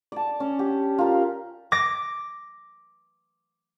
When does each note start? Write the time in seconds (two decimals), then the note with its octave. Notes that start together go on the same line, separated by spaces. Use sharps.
0.12 D5 A5
0.40 C#4
0.59 G4
0.98 F4 A#4
1.72 D6 A#6